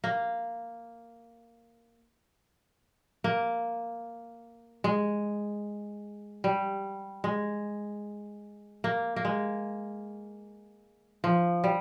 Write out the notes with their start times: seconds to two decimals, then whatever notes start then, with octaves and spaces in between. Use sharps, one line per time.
0.04 A#3
3.24 A#3
4.84 G#3
6.44 G3
7.24 G#3
8.84 A#3
9.16 A#3
9.25 G#3
11.24 F3
11.64 G3